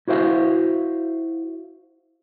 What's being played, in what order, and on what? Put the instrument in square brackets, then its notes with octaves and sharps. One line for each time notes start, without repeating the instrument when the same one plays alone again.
[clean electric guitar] E4 F#4 C5 E5 F5